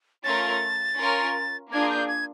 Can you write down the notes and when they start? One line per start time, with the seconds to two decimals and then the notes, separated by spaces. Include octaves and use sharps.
0.24 A3 C#4 F4 A#4 A6
0.98 C#4 F4 A#4
1.71 A#3 D4 F4 G#4 G#6
1.90 G6
2.08 G#6